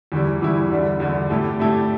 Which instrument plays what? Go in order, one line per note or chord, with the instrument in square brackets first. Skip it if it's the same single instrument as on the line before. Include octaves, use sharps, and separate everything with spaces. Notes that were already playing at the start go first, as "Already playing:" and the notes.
[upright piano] E2 E3 G3 E4
E2 E3 G3 E4
E2 D3 G3 D4
E2 D3 G3 D4
A2 A3 E4 G4
A2 A3 E4 G4